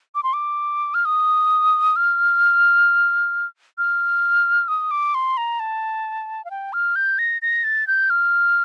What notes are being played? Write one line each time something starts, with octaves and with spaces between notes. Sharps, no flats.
D6
C6
D6
F6
D#6
F6
F6
D#6
D6
C6
A#5
A5
F5
G5
F6
G6
A#6
A#6
A6
G6
F6